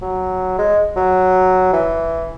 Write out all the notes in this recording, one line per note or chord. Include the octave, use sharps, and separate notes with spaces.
F#3
G#3
F#3
E3